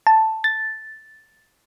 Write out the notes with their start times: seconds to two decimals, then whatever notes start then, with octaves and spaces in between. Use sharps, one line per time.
0.07 A5
0.44 A6